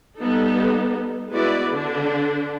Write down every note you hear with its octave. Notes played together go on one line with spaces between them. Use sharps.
G3 B3 D#4 A4
G#3 B3 E4 F#4 B4 D5
D3 D4